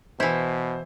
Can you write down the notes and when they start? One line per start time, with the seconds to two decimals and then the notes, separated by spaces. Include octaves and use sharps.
0.20 B2 E3 E4 C5